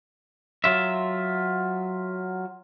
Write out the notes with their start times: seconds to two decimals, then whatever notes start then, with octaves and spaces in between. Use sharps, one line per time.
0.64 F#3 F4 E5